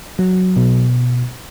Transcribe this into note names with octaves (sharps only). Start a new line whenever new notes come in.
F#3
B2